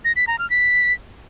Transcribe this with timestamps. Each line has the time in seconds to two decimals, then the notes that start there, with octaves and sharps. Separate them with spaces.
0.05 A#6
0.16 B6
0.27 A#5
0.39 F6
0.50 B6